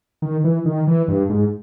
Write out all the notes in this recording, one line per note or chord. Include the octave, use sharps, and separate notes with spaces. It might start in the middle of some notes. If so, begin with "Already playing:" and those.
D#3
E3
D#3
E3
G2
G#2